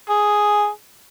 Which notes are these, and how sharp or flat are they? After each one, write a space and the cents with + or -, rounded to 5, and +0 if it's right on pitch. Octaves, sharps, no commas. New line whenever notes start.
G#4 +0